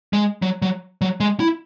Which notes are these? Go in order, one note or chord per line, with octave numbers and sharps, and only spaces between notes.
G#3
F#3
F#3
F#3
G#3
E4